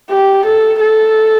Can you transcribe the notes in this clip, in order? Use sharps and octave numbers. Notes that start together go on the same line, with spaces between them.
G4
A4
A4